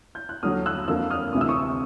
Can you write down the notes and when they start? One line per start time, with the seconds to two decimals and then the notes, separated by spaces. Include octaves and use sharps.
0.15 G6
0.29 F#6
0.43 D#2 D3 F#3 D#6 F6
0.66 E6 F#6
0.88 F2 D3 F3 A#3 E6 F#6
1.10 D#6 F6
1.33 D2 C3 E3 D#6
1.41 E6
1.49 C#6 D#6